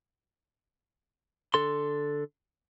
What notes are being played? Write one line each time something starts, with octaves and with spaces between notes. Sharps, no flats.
D3 A4 C6